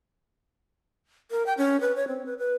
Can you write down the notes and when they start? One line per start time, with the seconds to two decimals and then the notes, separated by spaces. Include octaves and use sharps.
1.31 A#4
1.46 G5
1.58 C#4
1.81 B4
1.96 C#5
2.08 C4
2.26 B4
2.38 B4